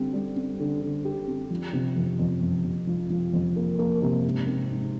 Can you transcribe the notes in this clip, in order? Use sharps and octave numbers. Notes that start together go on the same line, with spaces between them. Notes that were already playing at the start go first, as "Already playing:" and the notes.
Already playing: D3 G3 C4 G4
G3
C4
D3
D3
G4
C4
F3
C3
F2
F2
F2
C3
F3
F3
F2
A#3
A#3
C3
G#2
C4
G#2